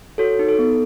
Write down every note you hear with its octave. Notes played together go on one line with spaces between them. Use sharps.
F#4 A4 C#5
D#4
A4
B3